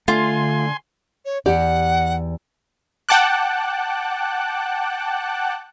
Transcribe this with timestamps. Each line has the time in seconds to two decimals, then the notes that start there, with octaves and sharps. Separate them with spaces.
0.08 D3 A3 F4 G#5 C6
1.25 C#5
1.46 E2 G4 D5 F#5
3.09 F#5 G5 A5 D6 F#6